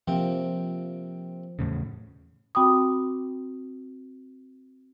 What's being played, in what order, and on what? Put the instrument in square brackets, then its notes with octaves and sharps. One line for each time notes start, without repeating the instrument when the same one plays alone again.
[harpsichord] C3 A#3 C4 [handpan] F3
[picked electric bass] E2 A2 C#3
[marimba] C4 F#4 G5 B5 D6 D#6